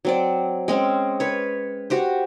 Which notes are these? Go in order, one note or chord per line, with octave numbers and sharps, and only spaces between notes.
F#3 C4 D5
G#3 C4 C#4
B4 C#5
F#4 G4 C5